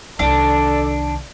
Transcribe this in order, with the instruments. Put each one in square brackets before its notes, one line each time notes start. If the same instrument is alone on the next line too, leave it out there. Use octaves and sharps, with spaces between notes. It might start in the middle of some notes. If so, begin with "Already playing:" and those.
[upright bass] C2 D#3 [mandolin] D4 [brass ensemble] A4 D5